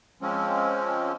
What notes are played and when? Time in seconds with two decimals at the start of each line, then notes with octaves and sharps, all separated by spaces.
0.22 F3 G#3 C4 C#4